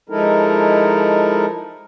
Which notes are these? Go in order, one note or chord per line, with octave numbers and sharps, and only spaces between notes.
F3 G#3 D#4 E4 A4 A#4